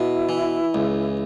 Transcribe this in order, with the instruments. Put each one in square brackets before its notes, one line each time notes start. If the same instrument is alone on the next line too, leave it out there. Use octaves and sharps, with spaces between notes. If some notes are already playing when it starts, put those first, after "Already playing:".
Already playing: [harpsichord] B2 [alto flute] E4
[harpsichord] E3
C#2